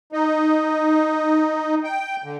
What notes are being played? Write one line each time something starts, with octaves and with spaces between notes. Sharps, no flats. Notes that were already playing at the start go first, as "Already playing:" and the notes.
D#4
G5
D3